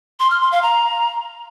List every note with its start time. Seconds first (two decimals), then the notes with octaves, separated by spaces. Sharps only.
0.20 C6
0.30 F6
0.41 C6
0.52 F5
0.62 A#5